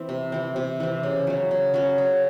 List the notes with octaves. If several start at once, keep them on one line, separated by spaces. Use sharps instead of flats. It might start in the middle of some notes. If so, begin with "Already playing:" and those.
Already playing: E3 C4
C3
E3 C4
C3
E3 C4
C#3
F#3 C#4
C#3
F#3 C#4
C#3